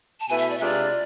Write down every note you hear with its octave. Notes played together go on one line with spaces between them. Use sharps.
A5
B2 A3 E4 B4 G#5
E5
D5
E5
C3 G#3 D4 F4 D5